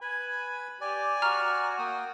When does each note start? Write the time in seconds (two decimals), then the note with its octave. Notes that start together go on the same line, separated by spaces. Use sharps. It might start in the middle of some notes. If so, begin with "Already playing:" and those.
0.02 B4 G#5 B5
0.81 G4 D5 G#5
1.22 F#4 A#5 C#6 F6
1.79 A#3 G5 D#6